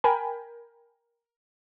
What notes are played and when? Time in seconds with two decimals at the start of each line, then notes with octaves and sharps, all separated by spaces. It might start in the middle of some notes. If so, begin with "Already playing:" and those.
0.04 A#4 G5 G#5 B5